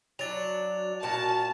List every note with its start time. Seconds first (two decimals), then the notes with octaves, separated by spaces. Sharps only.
0.19 F#3 D4 A6 F7
1.03 A#2 F#4 F5 A5